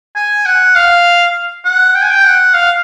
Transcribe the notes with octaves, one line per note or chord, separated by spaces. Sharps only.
G#5
F#5
F5
F#5
G5
G#5
G5
F#5
F5